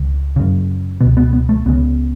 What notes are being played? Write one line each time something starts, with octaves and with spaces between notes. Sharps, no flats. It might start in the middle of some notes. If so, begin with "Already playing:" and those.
Already playing: C#2 C#3
F#2 C#3
C#2 B2 B3
B3
B3
A3
C#2 C#3 B3